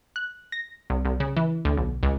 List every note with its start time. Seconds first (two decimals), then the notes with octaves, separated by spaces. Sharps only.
0.16 F#6
0.52 A#6
0.90 C2
1.05 C2
1.20 C#3
1.37 E3
1.65 D2
1.77 B1
2.03 C#2